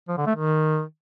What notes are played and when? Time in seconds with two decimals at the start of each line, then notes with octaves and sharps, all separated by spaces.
0.08 F3
0.17 D3
0.26 A3
0.35 D#3